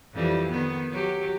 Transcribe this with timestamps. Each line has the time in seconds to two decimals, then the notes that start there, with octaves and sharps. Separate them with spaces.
0.13 F2 E3 G3
0.51 D#3 B3
0.91 F#3 G4